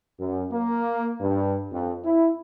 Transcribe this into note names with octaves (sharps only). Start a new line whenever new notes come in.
F#2
A#3
G2
F2
E4